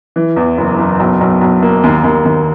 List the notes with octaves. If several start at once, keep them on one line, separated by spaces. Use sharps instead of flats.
E3
E2
F#1
F#1
B1
B1
B1
A#3
D#2
D#2
D#2